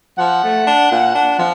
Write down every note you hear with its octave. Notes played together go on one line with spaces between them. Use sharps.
F3 F#5
A3
D4
A#2
D4
F3